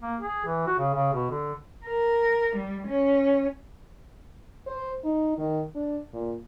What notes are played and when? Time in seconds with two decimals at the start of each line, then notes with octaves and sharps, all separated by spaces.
0.02 A#3
0.20 G#4
0.45 E3
0.66 F#4
0.78 C#3
0.94 C#3
1.13 B2
1.30 D3
1.85 A#4
2.56 G3
2.88 C#4
4.67 C5
5.05 D#4
5.38 D#3
5.75 D4
6.13 A#2